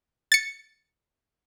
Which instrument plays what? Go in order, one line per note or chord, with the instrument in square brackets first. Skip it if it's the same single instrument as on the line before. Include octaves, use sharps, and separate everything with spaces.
[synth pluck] A6 C#7